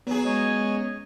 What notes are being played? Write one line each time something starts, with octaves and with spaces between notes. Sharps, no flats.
F#3 B3 G#4
G#3 C#4 C#5 D#5